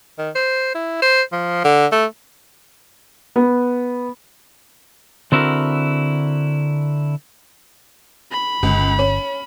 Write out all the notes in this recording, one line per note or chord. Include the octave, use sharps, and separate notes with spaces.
D#3
C5
E4
C5
F3
D3
A3
B3
D3 C4 E4 F#4 A#4
B5
G1 C#2
C#4